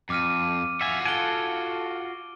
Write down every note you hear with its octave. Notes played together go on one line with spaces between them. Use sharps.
F2 D6 F6 D#7
F4 F#4 E5 G#5
A4 F#5 G#5 D7 G7